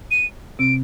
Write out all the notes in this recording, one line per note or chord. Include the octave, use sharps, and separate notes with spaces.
D#7
C3 C4 D7